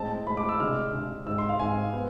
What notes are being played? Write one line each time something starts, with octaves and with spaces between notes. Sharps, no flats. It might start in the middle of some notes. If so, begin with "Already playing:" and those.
Already playing: A2 G#3 C4 A5
A2 G#3 C4 B5
D6
E6
C3 G#3 D4 F6
C3 G#3 D4
G#2 G#3 C4 E6
C6
F5
G#2 G#3 C4 G#5
B3